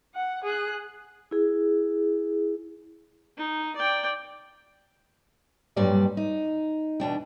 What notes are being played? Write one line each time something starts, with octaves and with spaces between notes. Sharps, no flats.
F#5
G#4 F#6
E4 G#4
D#4
D5 G5
G2 A#2 F#3 G3 D5
D#4
E2 B2 D4 G5